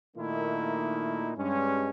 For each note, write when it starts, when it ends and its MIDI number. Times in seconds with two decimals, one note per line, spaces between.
0.16 1.32 46
0.16 1.32 51
0.16 1.32 57
0.16 1.32 58
0.16 1.32 63
0.16 1.32 64
1.37 1.90 43
1.37 1.90 56
1.37 1.90 61